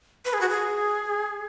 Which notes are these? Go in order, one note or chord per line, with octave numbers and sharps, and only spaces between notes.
B4
G#4
F#4
G#4